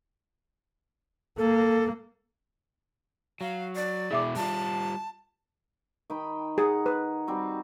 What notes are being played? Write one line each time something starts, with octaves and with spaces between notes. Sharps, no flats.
A#3 A4
F#3 F5
D5
B2 E4 G#4 E5 D6
G3 F4 A5
D#3 G5 B5
D#4 G#4 F#5 G#5
B4
G3 C4 F#4